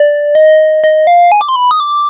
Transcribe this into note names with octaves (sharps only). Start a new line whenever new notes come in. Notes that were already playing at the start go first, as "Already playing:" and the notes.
Already playing: D5
D#5
D#5
F5
G#5
D6
C6
B5
D#6
D6